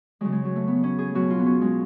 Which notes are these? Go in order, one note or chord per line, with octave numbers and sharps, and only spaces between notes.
C#3 F#3 G#3
G#3
F#3
A3
B3
C#4
G#4
B2 F#3 F#4
F4
B3
C#4
G#3